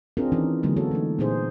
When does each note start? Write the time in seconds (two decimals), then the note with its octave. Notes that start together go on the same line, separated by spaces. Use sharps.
0.17 C4 D4 F4 G#4 A#4
0.32 D#3 E3 C4 C#4 D#4
0.63 D3 F#3 G#3 A#3
0.77 B3 F#4 A4 C#5
0.91 E3 A3 D#4
1.19 A#2 B3 D#4 G#4 C5